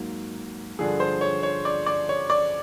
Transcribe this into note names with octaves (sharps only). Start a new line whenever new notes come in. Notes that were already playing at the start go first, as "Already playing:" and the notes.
Already playing: G#2 F#3 A#3
G2 D3 F3 G#4
C5
C#5
C#5
D5
D5
C#5
D5